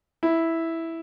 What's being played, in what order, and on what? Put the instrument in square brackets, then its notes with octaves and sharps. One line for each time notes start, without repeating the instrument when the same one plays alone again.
[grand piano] E4